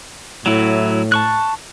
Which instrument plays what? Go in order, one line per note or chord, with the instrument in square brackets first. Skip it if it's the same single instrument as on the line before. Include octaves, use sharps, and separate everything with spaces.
[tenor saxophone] A2 [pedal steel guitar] F#3 E4
[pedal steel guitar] A5 C#6 F#6